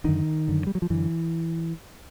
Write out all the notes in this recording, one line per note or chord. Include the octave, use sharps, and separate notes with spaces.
F#2 D3 D#3
F#2 D3
G3
F#3
F3
F#2 D3 E3